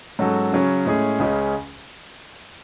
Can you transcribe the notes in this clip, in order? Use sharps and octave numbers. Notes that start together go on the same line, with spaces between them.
G#2 F#3 C#4 F#4 A4
C#3 F#3 C#4
A2 G#3 C#4 G#4
C#2 C#3 G#3 C#4